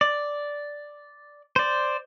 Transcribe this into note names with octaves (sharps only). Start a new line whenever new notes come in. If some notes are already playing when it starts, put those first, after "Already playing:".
D5
C5 D5